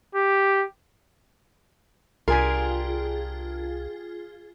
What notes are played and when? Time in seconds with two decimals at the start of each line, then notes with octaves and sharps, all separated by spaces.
0.15 G4
2.28 C2 D4 F4 G4 G#4 A#4 G#5 C6